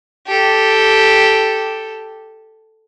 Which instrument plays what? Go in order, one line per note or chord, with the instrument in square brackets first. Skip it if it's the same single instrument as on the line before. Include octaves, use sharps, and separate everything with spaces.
[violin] G4 A4